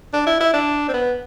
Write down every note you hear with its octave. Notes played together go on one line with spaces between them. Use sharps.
D4
E4
E4
D4
C4
B3